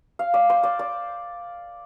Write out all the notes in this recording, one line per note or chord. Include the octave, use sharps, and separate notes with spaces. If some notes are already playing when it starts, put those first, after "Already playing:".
F5
D5
C5
D5
D5